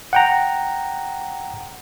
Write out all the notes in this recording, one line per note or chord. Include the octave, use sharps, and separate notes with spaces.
F#5 G5 A#5